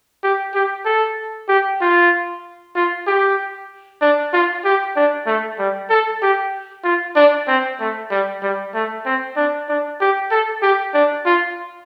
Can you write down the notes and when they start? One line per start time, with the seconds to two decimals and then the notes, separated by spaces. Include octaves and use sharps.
0.23 G4
0.54 G4
0.85 A4
1.48 G4
1.81 F4
2.75 F4
3.07 G4
4.01 D4
4.33 F4
4.65 G4
4.96 D4
5.26 A3
5.58 G3
5.89 A4
6.22 G4
6.84 F4
7.16 D4
7.47 C4
7.80 A3
8.10 G3
8.42 G3
8.74 A3
9.05 C4
9.36 D4
9.68 D4
10.00 G4
10.31 A4
10.62 G4
10.94 D4
11.25 F4